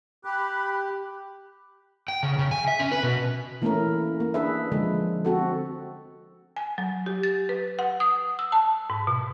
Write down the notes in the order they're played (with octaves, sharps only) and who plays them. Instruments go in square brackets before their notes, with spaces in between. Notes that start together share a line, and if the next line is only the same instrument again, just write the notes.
[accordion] G4 [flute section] B5 F#6
[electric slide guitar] G5
C#3
C#3
G#5
E5
C#4
B4
B2
[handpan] E3 A3 A#3 C#4 E4 A#4
A#3
D4 G#4 B4 E5
D3 F3 G#3
C4 F#4 A4
[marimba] G#5
F#3
G4
A6
B4
F#5
D#6
E6
A5
G#2
B2